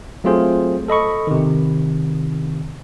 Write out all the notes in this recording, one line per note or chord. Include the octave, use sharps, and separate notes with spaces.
F#3 A3 C4 F4 G#4 C5
A4 D#5 B5 C#6
C3 D#3